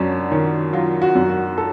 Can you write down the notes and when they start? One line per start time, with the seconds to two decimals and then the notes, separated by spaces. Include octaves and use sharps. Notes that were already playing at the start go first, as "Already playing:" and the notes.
Already playing: F#2 F#3 C#4 D4
0.31 D#3 C#4
0.73 F#3 F4
1.02 F#4
1.15 F#2
1.30 F#4
1.58 A4